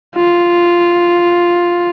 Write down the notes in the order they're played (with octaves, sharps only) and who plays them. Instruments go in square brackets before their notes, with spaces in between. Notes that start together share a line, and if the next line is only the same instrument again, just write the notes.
[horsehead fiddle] F4